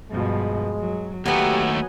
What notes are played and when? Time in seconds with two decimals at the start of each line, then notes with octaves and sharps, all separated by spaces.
0.11 G2 B2 F3 G#3
0.80 F#3
1.26 D#2 F#3 A3 B3 G4 F#5 G#5 A#5